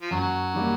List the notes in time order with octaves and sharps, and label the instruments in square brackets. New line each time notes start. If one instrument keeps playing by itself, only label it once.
[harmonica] F3
[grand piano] F#2 [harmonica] F#3
[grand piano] D#3 G3 A#3